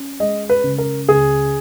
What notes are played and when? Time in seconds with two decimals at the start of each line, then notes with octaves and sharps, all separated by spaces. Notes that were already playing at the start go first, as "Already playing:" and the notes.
Already playing: C#4
0.20 G#3 D#5
0.50 B4
0.64 C#3
0.78 A#4
1.08 C#2 G#4